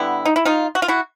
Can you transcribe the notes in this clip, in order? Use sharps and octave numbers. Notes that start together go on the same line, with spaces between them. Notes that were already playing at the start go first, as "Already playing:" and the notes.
Already playing: D3 G3 B3 E4
D#4
E4
D#4 F4
F#4
F4
E4 F#4